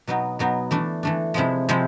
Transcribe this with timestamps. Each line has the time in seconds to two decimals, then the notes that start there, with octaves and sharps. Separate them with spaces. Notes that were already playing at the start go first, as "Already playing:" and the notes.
0.07 B2 F#3 B3 D#4
0.39 B2 F#3 B3 D#4
0.71 E3 A3 D4
1.03 E3 A3 D4
1.34 C3 F3 G#3 C4 E4
1.69 C3 F3 G#3 C4 E4